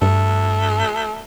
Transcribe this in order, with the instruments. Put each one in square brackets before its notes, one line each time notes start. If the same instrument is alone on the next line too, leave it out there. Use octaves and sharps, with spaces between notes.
[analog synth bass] G2 [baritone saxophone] A3